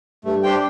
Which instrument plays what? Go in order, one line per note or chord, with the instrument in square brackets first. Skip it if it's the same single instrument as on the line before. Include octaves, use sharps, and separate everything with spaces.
[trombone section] G2 [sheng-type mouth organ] A3
[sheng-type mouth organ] D4 G4 C5 G5